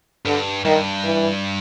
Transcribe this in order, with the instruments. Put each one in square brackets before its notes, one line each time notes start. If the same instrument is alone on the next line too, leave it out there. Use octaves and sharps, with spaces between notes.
[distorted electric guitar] G2 [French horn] D3
[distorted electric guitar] G2 [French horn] D#3
[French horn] E3